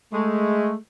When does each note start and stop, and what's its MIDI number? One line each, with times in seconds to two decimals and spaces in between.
0.13 0.76 56
0.13 0.76 57